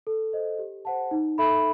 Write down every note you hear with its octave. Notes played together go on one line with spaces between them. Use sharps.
A4
C5 D#5
G4
C5 F#5 A5
D#4
A4 E5 B5